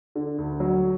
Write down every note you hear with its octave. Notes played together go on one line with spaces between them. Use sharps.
D3
D2
F#3